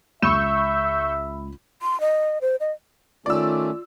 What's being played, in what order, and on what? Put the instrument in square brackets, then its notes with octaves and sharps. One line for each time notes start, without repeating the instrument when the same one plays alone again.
[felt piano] C#2 B5 E7 [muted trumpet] E5 [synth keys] C#6 E6 G6
[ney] C6
D#5
C5
D#5
[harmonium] D#3 A3 C#4 [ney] F4 [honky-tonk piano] D5 E6